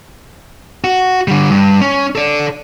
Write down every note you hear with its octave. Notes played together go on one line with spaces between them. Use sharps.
F#4
D3 G3
G2
C#4
A4 D5